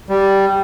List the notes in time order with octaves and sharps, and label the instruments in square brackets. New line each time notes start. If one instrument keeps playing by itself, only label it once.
[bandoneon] G3